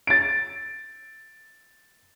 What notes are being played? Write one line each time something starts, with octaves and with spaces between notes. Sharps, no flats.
A6 D7